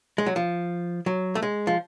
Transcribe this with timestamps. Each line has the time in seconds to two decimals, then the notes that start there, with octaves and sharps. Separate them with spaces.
0.18 G#3
0.26 F#3
0.36 F3
1.06 F#3
1.35 A3
1.43 G#3
1.67 F3